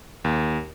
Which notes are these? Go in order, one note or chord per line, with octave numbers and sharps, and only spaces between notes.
D#2